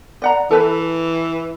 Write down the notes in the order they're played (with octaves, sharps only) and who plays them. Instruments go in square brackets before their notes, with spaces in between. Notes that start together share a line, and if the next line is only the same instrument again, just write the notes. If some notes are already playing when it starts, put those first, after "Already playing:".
[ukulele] D5 F#5 A#5
[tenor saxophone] E3 [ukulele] A4 B4 B5